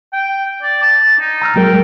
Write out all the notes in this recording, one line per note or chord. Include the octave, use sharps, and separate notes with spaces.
G5
D5
A5
D#4
A#5 E6 F6
F#3 G#3 A#4 G5